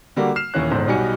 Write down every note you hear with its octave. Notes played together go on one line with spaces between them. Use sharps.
D3 G3 A#3 F#4 A#4
F6 C7 E7
D#1 D#2 E3 C#4 F#6
G1 G#2 C5
B1 B2 G3 D#4 G#5 C#7